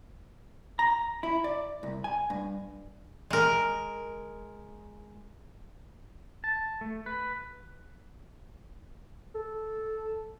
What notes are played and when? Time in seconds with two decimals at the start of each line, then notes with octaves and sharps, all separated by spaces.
0.79 A#5
1.23 E4
1.44 D5
1.83 C2
2.04 G#5
2.30 G2
3.30 G#3 A#4
6.44 A5
6.81 A3
7.06 B4
9.35 A4